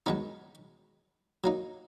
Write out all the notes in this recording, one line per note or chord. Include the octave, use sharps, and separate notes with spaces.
F#2 D#3 G#3 B3 D#4
F#3 A#3 D#4